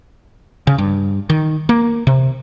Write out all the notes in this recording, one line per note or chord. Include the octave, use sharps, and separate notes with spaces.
C#3
G2
D#3
A#3
C3